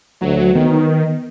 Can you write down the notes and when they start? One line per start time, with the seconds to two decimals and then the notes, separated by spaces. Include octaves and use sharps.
0.22 D2 F#3
0.55 D#3 B3